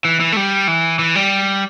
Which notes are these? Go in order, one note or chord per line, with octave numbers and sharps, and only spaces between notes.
E3
E3
A3
G3
E3
E3
G3